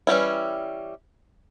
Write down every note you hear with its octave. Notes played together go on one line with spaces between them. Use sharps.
E3 G3 C#4 E4